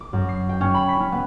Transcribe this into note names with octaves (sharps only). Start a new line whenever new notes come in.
D6
F#2
C7
G5
C#4
B5
B6
C#4
B3